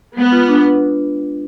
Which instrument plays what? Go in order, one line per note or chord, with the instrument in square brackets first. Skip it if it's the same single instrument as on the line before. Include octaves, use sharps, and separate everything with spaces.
[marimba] G#3 [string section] B3
[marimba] F4
D4
B4